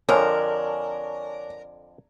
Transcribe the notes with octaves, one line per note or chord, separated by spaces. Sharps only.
F2 D3 F3 D4 A#4 C#5 G#5